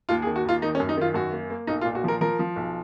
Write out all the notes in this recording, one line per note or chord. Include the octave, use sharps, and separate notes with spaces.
D#2 F4
G#4
D#3
F#4
D#2 F4
D#3 D#4
C#4
F#2
D#4
D#3 F4
F#2 F#4
A#3
A#3
B1 D#4
F4
A#2
F#4
F3 A#4
F3 A#4
F3
B1